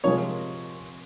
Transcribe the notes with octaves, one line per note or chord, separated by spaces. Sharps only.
C3 F3 G#3 C#5